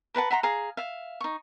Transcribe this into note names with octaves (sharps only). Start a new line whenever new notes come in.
A#4 B4 F#5 A5
E5 F#5 A#5 C6
G#4 F5 A#5
E5 F5
D#4 C#6